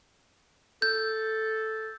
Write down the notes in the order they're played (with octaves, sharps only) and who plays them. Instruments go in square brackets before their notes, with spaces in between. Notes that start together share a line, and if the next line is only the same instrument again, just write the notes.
[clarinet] A4 [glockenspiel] G6